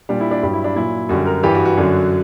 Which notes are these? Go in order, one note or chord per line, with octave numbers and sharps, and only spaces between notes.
A#2 G3 D4
E4
D4
G2 F#3 G4
E4
D4
A#2 F#3 E4
F#2 D3 G3 F#4
A#4
G2 E3 G3 G4
F#4
F#4
F#2 D3 F#3